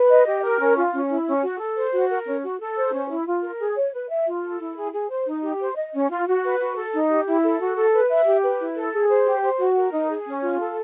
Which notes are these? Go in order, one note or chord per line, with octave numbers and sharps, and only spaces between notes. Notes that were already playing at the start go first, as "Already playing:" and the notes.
Already playing: B4
D#5
G4
A#4
C#4
F4
C#4
E4
C#4
F#4
A4
C5
F#4
A#4
C#4
F#4
A4
C5
C#4
E4
F4
A#4
G#4
C#5
B4
E5
F4
A4
E4
G#4
G#4
C5
D#4
G4
C5
D#5
C#4
F4
F#4
B4
F#4
A4
D#4
G4
E4
A4
F#4
A4
B4
E5
G4
B4
E4
A4
G#4
C5
G4
C5
F#4
A#4
D#4
G#4
C#4
F4
A4